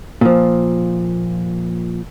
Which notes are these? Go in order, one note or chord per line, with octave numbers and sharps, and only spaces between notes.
A#2 F3